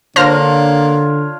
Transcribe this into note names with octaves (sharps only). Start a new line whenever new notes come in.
D3 A#3 D4 F4 C5 C#5 F6 A#6